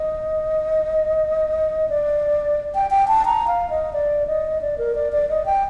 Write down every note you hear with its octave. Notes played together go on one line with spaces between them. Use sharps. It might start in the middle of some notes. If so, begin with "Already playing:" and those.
Already playing: D#5
D5
G5
G5
A5
A#5
F5
D#5
D5
D#5
D5
A#4
D5
D5
D#5
G5